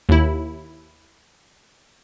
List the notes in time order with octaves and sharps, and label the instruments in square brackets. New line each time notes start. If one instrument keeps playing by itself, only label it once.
[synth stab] D#2 E4